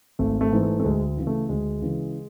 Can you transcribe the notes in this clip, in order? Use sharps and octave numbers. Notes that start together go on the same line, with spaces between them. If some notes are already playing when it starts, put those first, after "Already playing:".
G#1 A3
A3
G#2 E3
A3
A3
D2 G#3
C#3 E3
A3
D2 G#3
C#3 E3